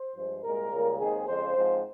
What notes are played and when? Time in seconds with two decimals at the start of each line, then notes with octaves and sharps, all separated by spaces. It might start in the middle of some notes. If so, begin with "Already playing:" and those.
Already playing: C5
0.14 G2 F3 G#3
0.43 C2 A#2 G#3 A#4
0.72 C#2 C#3 G3 A#3
0.99 D#2 D#3 G#3 C4 G#4
1.28 F2 C#3 G#3 C5
1.56 G#2 F3 C4